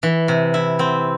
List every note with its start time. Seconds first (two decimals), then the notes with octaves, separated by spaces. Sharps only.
0.03 E3
0.28 C3
0.54 E4
0.79 C4